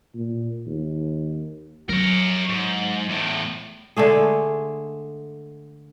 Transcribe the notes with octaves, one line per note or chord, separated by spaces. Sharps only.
A#2
D#2
F#3 A#4 C#5
G#2
E2 A2
D3 G#3 A3 G#4